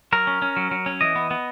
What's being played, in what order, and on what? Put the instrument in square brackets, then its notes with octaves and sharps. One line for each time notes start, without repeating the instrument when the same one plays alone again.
[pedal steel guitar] F#3 A#4
C#4
C#4
F#3
F#3
C#4
E3 D#5
B3
B3